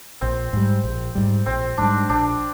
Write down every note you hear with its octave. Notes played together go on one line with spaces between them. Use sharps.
A#1 C4
G#2 G3
A#1
G#2 G3
A#1 C4
G#2 G3 D4
A#1 D4